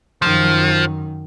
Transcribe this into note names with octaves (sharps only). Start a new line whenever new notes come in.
F#2 D#3 F3